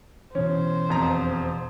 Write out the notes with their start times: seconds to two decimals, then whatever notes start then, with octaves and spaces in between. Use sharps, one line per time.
0.35 B2 E3 C#4 C5
0.89 E1 F2 A#5